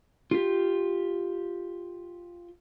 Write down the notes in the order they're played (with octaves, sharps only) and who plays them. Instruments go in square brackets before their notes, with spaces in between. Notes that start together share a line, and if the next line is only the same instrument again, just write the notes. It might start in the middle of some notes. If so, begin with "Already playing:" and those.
[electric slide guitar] F4 G4